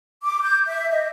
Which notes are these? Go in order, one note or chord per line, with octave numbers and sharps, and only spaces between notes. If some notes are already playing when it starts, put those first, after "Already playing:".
D6
G6
E5
D#5